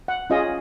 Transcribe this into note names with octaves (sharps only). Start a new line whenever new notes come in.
F#5
C#4 F4 G#4 D#5